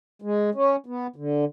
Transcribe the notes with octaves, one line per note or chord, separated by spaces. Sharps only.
G#3
C#4
B3
D3